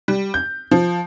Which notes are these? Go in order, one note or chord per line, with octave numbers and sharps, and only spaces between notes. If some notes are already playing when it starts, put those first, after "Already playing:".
G3
G6
F3